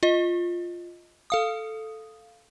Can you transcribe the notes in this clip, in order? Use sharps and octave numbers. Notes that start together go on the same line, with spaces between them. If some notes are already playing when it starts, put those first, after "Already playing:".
F4 D#5
A4 F5 D#6